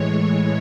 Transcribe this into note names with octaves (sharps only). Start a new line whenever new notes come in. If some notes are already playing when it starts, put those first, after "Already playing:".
Already playing: A2 E3 G#3 C#5